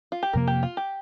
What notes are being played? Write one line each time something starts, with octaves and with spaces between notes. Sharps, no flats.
F4
G4
F2 C3 F3 A#3 A#4
G4
F4
G4